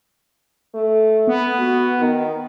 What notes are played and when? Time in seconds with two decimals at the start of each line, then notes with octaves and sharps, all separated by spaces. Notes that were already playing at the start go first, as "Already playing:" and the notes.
0.75 A3
1.27 B3
1.59 F#4
2.00 D#3